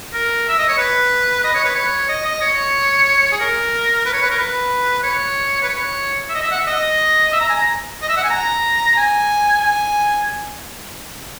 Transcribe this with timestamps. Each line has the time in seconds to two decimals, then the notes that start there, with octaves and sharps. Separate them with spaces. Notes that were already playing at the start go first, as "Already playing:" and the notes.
0.13 A#4
0.49 E5
0.58 D#5
0.69 C#5
0.78 B4
1.44 D#5
1.55 C#5
1.64 B4
1.75 C#5
2.09 D#5
2.25 D#5
2.42 C#5
3.32 G#4
3.40 A#4
4.06 B4
4.14 C#5
4.22 B4
4.30 A#4
4.38 B4
5.03 C#5
5.62 B4
5.69 C#5
6.29 E5
6.35 D#5
6.42 E5
6.52 F#5
6.60 E5
6.67 D#5
7.32 E5
7.40 A#5
7.49 G#5
7.57 A#5
8.02 D#5
8.09 E5
8.17 F#5
8.24 G#5
8.31 A#5
8.97 G#5
9.61 G#5